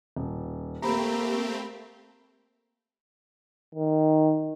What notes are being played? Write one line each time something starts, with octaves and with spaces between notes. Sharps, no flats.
D#1
A3 A#3 C4 G4 A#5 B5
D#3